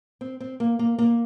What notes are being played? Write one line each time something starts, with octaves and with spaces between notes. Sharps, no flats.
C4
C4
A#3
A#3
A#3